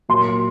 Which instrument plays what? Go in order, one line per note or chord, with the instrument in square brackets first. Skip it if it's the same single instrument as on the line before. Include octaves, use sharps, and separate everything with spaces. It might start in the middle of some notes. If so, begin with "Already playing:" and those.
[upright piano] A#2 F#3 A#3 C6